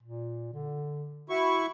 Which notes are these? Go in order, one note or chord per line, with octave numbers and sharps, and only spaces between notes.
A#2
D3
E4 F#4 C#6